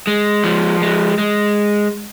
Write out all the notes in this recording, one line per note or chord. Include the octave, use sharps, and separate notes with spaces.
G#3
F3
G#3
G#3